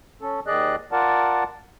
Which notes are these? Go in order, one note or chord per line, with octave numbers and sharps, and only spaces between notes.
C#4 A4
D#2 D#3 G#4 D5 D#5 F#6
F4 A#4 D5 F#5 A5